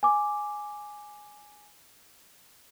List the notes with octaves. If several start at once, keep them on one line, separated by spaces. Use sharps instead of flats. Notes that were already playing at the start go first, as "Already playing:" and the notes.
G#5 D6